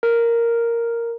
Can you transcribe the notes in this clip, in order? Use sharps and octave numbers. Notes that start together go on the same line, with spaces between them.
A#4